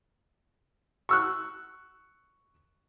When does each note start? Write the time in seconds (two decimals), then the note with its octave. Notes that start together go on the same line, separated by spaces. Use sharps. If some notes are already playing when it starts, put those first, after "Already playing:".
1.09 C#6 E6 F#6